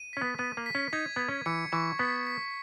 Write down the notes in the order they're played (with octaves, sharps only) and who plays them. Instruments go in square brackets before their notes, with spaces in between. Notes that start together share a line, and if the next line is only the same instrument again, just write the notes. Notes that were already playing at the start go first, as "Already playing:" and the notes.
Already playing: [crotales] D#7
[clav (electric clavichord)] C#4 [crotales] B6
[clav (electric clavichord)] B3
[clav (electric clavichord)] B3 [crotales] D#7
[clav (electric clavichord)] A#3
[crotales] B6
[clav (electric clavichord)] C#4
[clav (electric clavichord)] D#4 [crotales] G#6
[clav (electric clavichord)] B3 [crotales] G#6
[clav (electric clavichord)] C#4
[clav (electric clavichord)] E3 [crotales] C#7
[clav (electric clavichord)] E3 [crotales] C#6
[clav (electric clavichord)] B3 [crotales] B6
[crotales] B6